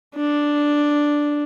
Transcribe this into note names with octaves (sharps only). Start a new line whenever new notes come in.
D4